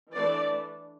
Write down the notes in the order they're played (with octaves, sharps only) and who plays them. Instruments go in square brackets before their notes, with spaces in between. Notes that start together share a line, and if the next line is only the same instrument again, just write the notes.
[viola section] E3 A3 D4 D5